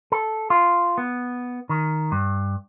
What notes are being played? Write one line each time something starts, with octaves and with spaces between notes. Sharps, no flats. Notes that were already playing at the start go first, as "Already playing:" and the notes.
A4
F4
B3
D#3
G2